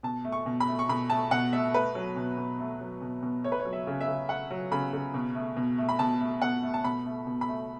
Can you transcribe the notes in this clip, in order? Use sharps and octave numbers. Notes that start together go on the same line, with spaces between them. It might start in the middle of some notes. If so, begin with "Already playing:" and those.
B2 A5
A3
C#6
B2
B5
A3
C#6
B2 B5
A3 A5
B2 F#5
A3 E5
A3 B4
F#3
B2
B2
A3
F#3
B2
B2
A3 C#5
B4
C#5
F#3
E5
C#3
E5
C#3
A3 F#5
F#3
C#3 B5
C#3
B2
A3
B2
A3
B5
B2 A5
A3
B2 F#5
A3
A5
B2 B5
A3
B2
B5
A3